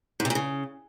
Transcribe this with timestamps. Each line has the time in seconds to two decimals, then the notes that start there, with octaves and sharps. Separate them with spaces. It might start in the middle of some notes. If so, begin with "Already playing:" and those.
0.20 G#2
0.25 C3
0.30 A#2
0.35 C#3